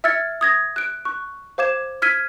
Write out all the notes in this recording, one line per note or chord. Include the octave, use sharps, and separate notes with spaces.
E5 E6 F6 G#6 A6 C#7
D#6 G#6 A#6
F#6 D7
C#6 F#6
C5 F5 D6 G#6 E7
E6 F6 G#6 B6 D#7